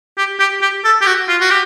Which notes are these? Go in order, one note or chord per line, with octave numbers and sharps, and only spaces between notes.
G4
G4
G4
A4
G4
F#4
F4
F#4
G4